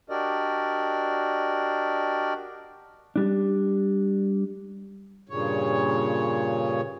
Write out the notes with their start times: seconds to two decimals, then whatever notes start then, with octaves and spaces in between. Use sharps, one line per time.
0.10 D4 F#4 G4 A#4 D5 D#5
3.16 G3 D4
5.29 G2 A#2 C#3 C#5